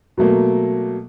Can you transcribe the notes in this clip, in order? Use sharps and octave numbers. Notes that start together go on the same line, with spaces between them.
B2 F#3 A3 A#3